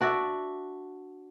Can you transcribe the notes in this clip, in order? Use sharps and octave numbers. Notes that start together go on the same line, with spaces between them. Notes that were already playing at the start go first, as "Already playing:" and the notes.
D4 F#4 D5 E5